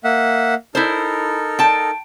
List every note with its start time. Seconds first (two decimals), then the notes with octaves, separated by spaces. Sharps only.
0.04 A#3 E5 F#5
0.75 D#4 E4 A4 A#4 C5
1.59 G5 A5